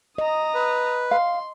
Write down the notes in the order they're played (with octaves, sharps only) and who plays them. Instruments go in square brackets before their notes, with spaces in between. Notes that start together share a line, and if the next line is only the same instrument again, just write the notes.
[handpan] D#5 [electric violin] A#5 D#6
[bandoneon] B4
[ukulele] F5 [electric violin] C6